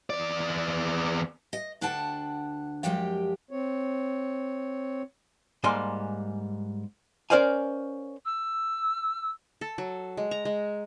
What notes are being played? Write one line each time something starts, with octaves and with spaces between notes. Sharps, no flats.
E2 D5
D#5
D2 D4 F#5 G5 A5
F#2 F3 G#3 G4 G5
C4 C#5
G#2 G3 A#3 G#5 C6
C#4 A#4 C5 D5 F5 G#5
E6
A4
F#3
G#3
A#5
G#3